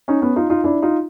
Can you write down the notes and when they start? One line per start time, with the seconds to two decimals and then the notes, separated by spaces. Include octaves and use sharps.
0.08 C#4 D#4
0.22 B3 C#4
0.36 D#4 F4
0.50 D#4 F4
0.64 D4 E4
0.82 D#4 F4